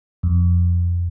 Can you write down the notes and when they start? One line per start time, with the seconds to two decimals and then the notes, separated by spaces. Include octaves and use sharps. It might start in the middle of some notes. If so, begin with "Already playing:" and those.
0.23 F2